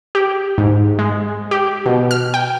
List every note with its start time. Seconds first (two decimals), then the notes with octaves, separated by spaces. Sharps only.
0.15 G4
0.58 G#2
0.99 G#3
1.51 G4
1.86 B2
2.11 F6
2.34 G5